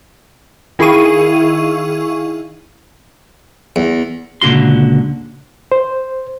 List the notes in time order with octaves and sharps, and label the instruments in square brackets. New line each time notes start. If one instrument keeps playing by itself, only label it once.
[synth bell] D#3 E4 G#4 F5 C#6 D#7
[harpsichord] E2
[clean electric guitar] C#2 A#2 D3 F#4 C6
[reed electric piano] C5